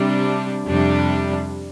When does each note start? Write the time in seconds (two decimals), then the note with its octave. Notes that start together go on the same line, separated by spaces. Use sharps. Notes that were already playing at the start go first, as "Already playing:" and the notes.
Already playing: C3 G3 D4
0.65 F2 C3 G3 D4